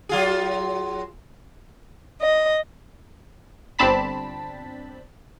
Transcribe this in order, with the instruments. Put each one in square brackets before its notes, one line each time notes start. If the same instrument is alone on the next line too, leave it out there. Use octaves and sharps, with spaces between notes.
[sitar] F#3 F4 G#4
[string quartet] D#5
[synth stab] G1 C4 D4 A5 B5 B6